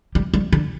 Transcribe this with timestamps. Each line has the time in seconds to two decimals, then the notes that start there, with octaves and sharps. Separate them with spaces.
0.15 G3
0.34 G3
0.52 D3